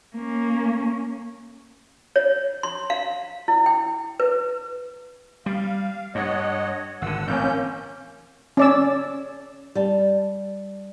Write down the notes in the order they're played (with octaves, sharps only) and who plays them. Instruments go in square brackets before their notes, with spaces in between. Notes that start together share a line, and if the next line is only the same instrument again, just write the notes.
[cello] A#3 C#4
[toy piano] C#5
C6
F5
E4
G5
B4
[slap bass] G3 [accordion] F5
[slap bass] G2 [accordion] C#5 D#5 F#5
[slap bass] G#1 D3 [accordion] F#5 E6
[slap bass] A1 A2 C4 [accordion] A#3 C#4 G6
[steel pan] C#4 D5 E6
[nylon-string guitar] G3 A5